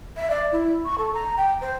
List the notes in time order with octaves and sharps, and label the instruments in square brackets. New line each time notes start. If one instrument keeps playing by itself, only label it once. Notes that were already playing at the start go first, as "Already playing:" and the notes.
[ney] E5
D5
E4
C#6
A4
A#5
G5
C5